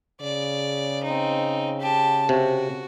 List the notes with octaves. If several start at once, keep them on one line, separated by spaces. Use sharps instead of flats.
C#3 D5
C4 D#4
G4 A5
C3 F#4